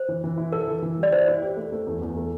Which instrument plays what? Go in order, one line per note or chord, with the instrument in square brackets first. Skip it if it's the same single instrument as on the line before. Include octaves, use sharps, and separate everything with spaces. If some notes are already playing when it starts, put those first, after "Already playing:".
Already playing: [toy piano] C5
[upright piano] E3
E3
E4
[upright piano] A4 [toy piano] A#4
[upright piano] E3
E3
[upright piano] G3 [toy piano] D5
[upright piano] E3 [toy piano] C5
[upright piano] E4
G4
A3
A3
E2
E2
A3